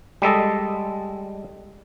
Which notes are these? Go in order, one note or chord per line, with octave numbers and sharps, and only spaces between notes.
G3 G#3 A4 D#5